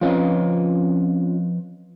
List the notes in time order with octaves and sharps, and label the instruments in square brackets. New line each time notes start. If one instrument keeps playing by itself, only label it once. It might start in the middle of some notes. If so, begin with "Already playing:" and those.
[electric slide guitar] F3 B4 D#5 [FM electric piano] C4 C#4 F4